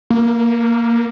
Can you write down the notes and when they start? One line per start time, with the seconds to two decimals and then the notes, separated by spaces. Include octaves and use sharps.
0.10 A#3